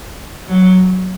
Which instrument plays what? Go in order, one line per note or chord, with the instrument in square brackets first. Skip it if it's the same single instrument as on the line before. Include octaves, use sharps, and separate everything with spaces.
[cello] F#3